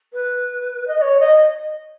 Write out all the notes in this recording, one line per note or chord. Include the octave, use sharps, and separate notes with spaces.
B4
D#5
D#5
C#5
D#5